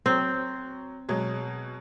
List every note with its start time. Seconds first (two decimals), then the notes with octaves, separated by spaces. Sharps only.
0.06 F#3 C4
1.08 B2 F#3 G#3